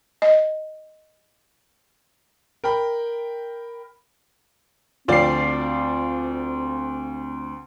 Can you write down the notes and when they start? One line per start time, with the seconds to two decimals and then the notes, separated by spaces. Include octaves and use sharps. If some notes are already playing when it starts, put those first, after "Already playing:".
0.22 D#5
2.64 A#4 G5 B5
5.08 D2 F3 C4 F4 D5 G5 C7